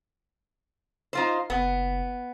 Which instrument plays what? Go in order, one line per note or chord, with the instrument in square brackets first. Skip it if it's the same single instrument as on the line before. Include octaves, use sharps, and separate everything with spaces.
[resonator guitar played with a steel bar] D#4 F4 C5
[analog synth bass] F#1 [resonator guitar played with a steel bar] B3